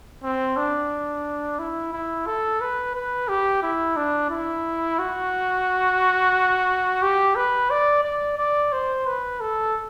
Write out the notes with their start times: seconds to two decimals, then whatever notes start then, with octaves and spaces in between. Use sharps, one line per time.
0.23 C4
0.57 D4
1.59 E4
1.93 E4
2.27 A4
2.61 B4
2.95 B4
3.28 G4
3.63 E4
3.96 D4
4.31 E4
4.99 F#4
7.02 G4
7.36 B4
7.71 D5
8.04 D5
8.38 D5
8.73 C5
9.07 B4
9.40 A4